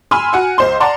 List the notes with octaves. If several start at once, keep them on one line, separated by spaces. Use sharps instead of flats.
G#5 B5 C6 E6 F6
F#4 F#5 G#5
C#2 C5 C6
D5 F#5 A5 A#5 C6